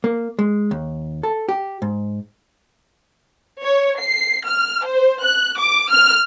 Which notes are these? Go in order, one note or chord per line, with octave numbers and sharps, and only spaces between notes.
A#3
G#3
D#2
A4
G4
G#2
C#5
C7
F6
C5
F#6
D6
F6